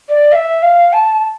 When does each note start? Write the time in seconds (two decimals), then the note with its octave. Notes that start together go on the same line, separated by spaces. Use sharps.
0.09 D5
0.32 F5
0.35 E5
0.62 F5
0.93 A5